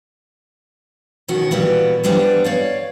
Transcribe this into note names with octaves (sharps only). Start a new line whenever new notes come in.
B2 D#3 C#4 F#4
A#2 E3 G3 B3 F#4
E3 F3 G3 B3 D4
C#5 D5 F5